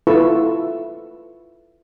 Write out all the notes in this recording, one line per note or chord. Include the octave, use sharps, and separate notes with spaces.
E4 F4 A4 B4 C#6 E6